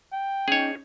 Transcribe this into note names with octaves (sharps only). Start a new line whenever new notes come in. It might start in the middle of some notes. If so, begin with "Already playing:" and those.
G5
C#4 D#4 G#4 C#5